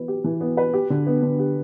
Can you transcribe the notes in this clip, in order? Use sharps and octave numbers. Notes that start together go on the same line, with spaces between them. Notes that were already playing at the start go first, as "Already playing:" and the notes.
Already playing: E3 B3 B4
G4
E3
B3
B4
G4
D3
B3
D3
G4